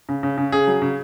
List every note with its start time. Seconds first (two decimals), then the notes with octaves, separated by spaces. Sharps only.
0.09 C#3
0.23 C#3
0.38 C#3
0.52 C#3 G#4
0.67 F#3
0.82 C#3